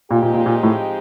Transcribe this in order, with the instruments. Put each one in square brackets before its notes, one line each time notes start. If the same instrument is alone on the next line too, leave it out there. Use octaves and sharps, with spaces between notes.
[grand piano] A#2 [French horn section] F3 G#3 C4 D#4 G4
[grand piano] A#2
A#2
A#2
A2